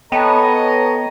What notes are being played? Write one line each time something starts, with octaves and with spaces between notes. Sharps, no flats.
B3 A4 C#5 D#5 G5 A5 A#5